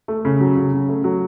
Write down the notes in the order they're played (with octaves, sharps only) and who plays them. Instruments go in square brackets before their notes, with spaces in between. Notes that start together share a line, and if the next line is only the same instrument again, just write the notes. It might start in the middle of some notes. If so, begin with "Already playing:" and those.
[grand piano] A3
C#3
F#3
C#3
C#3
A3
F#3